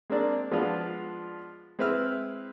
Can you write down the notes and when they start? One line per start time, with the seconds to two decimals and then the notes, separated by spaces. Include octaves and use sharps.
0.10 G#3 A#3 C4 D4 D5
0.52 F3 G#3 B3 D4 F4
1.79 G#3 C4 E4 B4 E5 F6